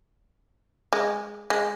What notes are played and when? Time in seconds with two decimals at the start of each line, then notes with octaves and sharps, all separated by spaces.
0.93 G#3
1.50 G#3